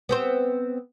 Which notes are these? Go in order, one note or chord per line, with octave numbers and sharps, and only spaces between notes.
B3 C4 C5